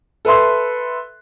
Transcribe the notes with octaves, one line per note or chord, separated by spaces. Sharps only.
A4 B4 E5 C6